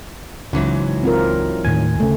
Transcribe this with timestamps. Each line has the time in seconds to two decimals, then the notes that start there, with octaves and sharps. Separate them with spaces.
0.53 C#2 G#2 E3 F#3
1.03 C4 F4 A#4
1.65 D#2 A2 D#3 G#5
2.00 D2 C#3 A3